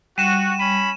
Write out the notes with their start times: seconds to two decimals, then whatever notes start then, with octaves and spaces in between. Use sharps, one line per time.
0.18 G3 F#4 D#7 E7
0.60 C#4 B5 D#7